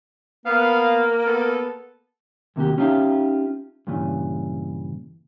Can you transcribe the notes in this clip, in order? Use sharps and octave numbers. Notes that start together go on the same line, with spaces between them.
A#3 B3 F5
B3 A4
D#2 C3 A#3 F#4 G4
C#4 D#4 F4 G4 E5 F5
G2 A#2 C#3 E3